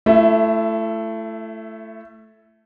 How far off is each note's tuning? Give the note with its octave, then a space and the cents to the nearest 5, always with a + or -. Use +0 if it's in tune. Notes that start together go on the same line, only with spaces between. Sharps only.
A3 +0 E4 +35 E5 +0